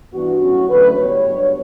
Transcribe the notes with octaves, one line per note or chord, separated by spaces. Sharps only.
G2 E3 B3 D4 F#4
A2 F#3 C#4
E2 D3 F#3 A3 C#4 B4
A2 G3 B3 C#5
G2 F#3 B3 D4